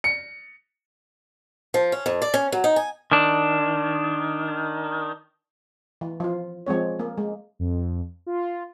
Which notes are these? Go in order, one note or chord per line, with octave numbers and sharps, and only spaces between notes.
C#7
F3
C#4
F2
D5
C#4
F#3
D#4
G#5
D#3 D4
E3
F3 F4
F3 G#3 C4 C#5
A#3
G#3
F2
F4